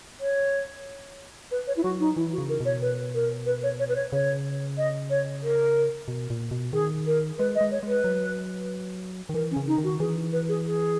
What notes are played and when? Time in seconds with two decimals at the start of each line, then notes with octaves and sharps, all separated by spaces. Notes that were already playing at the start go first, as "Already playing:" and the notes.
0.20 C#5
1.51 B4
1.67 C#5
1.77 E4
1.83 F#3 F#4
2.00 D#4
2.16 E3 E4
2.32 F#4
2.38 C#3
2.49 A#4
2.60 B2 C#5
2.81 B4
3.14 A#4
3.46 B4
3.63 C#5
3.79 C#5
3.89 B4
3.96 C#5
4.12 C#3 C#5
4.77 D#5
5.10 C#5
5.43 A#4
6.08 B2
6.30 A#2
6.51 B2
6.73 D#3 G#4
7.06 A#4
7.38 G#3 B4
7.55 D#5
7.61 G#3
7.71 C#5
7.83 G#3 B4
8.04 F#3
9.29 D#3
9.34 E3 A#4
9.51 C#4
9.56 C#3
9.67 D#4
9.78 D#3
9.84 F#4
10.00 E3 G#4
10.33 B4
10.49 G#4
10.65 G#4